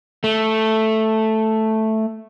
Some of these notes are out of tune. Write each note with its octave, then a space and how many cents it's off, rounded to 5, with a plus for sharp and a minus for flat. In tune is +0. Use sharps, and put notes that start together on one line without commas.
A3 +0